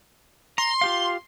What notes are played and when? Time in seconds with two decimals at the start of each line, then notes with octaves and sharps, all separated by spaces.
0.58 A#5 C6
0.81 F4 G4 F5